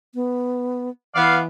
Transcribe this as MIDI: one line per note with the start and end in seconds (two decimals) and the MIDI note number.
0.15 0.90 59
1.15 1.47 52
1.15 1.37 59
1.15 1.37 74
1.15 1.37 77